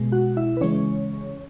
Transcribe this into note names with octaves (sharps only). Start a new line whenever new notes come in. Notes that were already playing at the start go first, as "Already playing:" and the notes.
Already playing: B2 G#3
F#4 F#5
E4 E5
B4
C#3 E3 G#3 C#4 C#5